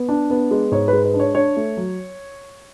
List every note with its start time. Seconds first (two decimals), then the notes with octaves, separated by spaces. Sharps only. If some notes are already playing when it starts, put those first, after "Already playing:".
Already playing: B3
0.09 D4
0.30 B3
0.51 G#3
0.72 G#2 C#5
0.88 G#3 B4
1.04 B4
1.14 D4
1.20 C#5
1.35 D4 C#5
1.57 A3
1.77 F#3